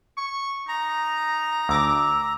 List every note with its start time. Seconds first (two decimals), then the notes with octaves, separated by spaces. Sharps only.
0.17 C#6
0.68 D#4 A#5
1.69 D2 D6 E6 A#6